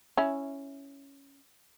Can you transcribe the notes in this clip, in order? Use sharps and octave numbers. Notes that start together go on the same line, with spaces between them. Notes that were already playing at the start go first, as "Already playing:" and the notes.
C#4 E4